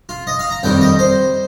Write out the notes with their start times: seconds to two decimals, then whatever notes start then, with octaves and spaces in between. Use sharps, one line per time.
0.09 F4
0.27 D#5
0.39 F5
0.51 A#5
0.63 F2 D#3 G3 G5
0.81 D#5
0.99 C5